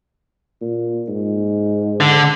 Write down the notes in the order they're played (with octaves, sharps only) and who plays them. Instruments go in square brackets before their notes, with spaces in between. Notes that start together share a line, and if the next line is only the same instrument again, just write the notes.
[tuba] A#2
G#2
[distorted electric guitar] D3